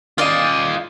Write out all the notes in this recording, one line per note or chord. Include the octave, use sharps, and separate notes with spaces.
F4 D5 D#5 F5